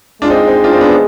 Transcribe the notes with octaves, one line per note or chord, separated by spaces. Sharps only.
G#3 D4 F4
C4 D#4
C4 D#4
D4 F4
C4 D#4
B3 D4